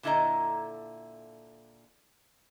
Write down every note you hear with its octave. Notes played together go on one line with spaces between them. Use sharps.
A#2 D3 E4 A4 D#5 A#5